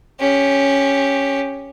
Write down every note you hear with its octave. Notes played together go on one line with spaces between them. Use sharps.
C#4 G4